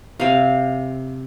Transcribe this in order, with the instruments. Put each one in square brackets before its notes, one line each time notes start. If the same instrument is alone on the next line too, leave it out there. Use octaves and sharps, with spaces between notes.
[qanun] C3 F5